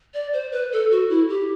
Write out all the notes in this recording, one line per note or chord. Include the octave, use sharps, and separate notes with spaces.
D5
C5
B4
A4
F#4
E4
G4